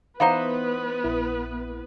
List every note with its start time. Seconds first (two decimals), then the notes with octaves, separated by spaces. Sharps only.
0.20 E3 B3 D#4 B4 C5 F5 F#5 A#5
1.04 A#1 E4